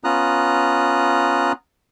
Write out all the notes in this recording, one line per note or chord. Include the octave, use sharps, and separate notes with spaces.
B3 C#4 F4 A#5 D#6 F#6